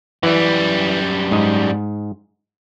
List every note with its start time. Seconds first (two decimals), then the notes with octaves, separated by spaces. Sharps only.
0.23 F#2 E3 G3
1.31 G#2 D#5